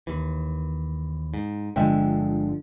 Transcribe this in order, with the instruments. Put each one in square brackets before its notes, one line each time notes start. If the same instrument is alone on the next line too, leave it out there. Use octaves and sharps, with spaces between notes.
[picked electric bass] D#2 E3
G#2
[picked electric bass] G1 D3 F3 [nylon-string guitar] G#3 E5 G5